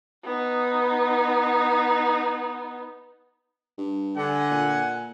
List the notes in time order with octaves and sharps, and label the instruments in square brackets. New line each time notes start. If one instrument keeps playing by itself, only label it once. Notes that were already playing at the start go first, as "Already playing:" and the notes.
[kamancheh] B3 D#4
[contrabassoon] G2
[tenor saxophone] D3 [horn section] F#5 G#5
[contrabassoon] A#2